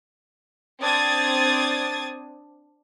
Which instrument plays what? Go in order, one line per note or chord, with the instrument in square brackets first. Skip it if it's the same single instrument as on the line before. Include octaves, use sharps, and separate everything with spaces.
[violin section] C4 D4 D#6 G#6 A6